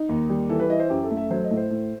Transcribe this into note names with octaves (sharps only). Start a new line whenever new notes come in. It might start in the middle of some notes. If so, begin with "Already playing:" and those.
Already playing: D#4
D#2
G3
E3 A4
B4
E4 D#5
C5
F#2 G4
A4
A3
E5
F#3 C5
D#5
A2
C5
A2